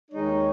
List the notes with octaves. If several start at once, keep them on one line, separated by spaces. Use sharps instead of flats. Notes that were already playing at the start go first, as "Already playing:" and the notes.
D#2 D#3 G#3 D#4 C#5